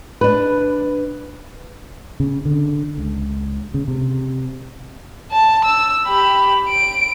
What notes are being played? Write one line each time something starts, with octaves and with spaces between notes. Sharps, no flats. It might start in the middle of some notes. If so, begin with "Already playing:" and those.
D4 B4
C#3
D3
C#2
C#3
C3
A5
E6
G4 B5
D7